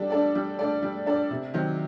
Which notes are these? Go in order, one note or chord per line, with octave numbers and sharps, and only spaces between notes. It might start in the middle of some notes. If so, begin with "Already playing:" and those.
Already playing: G3 D4 A4 D5
D4 A4 D5
G3
D4 A4 D5
G3
D4 A4 D5
C3
D#3 F#3 C4